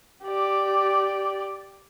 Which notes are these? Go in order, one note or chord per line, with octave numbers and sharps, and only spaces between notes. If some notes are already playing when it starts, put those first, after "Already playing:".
G4 D5